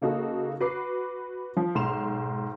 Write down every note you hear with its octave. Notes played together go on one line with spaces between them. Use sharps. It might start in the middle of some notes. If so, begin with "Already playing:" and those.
C#3 A#3 D#4 F#4 A4
F#4 B4 D6 C7
F3
B1 G#2 C6 E7 F7